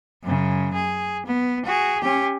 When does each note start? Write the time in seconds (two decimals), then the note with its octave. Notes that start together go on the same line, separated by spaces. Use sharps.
0.23 F#2 C#3
0.73 G#4
1.26 B3
1.65 F#4 G#4
2.00 C#4 G4